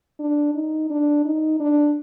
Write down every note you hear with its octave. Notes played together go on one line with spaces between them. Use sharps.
D4
D#4
D4
D#4
D4